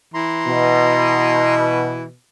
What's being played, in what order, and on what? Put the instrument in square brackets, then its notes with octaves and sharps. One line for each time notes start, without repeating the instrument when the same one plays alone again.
[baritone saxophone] E3 [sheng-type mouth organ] A#5 C6
[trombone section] B2